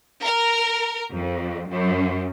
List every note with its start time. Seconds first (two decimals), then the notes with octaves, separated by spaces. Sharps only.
0.23 A#4
1.13 F2
1.69 F#2